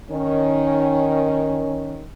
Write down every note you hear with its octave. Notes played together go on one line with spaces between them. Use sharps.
D#3 C#4